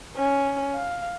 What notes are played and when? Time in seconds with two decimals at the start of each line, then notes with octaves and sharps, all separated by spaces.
0.16 C#4
0.74 F5